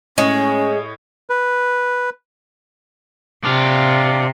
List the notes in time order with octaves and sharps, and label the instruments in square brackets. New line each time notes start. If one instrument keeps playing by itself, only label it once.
[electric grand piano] A2 C#5 D#5 [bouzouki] G#3 [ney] C#4
[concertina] B4
[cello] C3 [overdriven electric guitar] D4 F4